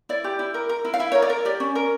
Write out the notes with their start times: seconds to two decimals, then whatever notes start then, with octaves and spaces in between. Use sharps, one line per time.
0.09 E4 D5
0.24 G4
0.39 E4
0.54 A#4
0.69 A#4
0.85 E4
0.94 F5
0.99 E4 E5
1.12 A#4 C#5
1.22 D5
1.30 A#4
1.45 G4 D5
1.60 C#4
1.75 A#4